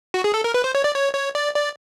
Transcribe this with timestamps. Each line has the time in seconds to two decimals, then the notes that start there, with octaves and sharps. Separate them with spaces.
0.14 F#4
0.24 G#4
0.34 A4
0.44 A#4
0.54 B4
0.64 C5
0.75 C#5
0.84 D5
0.95 C#5
1.15 C#5
1.35 D5
1.55 D5